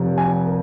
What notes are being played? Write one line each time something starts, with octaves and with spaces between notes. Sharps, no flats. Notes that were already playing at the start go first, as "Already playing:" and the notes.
Already playing: F1 F2 C3
G#5
A#4